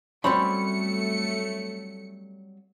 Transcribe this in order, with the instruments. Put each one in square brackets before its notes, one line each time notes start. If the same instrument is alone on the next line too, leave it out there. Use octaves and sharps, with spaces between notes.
[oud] F#3 G3 [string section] A3 C#7 [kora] C4 C#4 [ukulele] B5